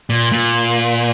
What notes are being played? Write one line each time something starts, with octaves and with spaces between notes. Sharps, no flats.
A#2
A#2